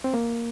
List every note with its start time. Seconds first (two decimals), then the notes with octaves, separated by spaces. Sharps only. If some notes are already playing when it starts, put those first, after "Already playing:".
0.04 C4
0.14 A#3